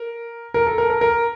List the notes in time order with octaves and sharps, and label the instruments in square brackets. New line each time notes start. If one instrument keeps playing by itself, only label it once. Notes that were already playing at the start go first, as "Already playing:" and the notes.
Already playing: [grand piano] A#4
A#4
A4
A#4
A#4
A#4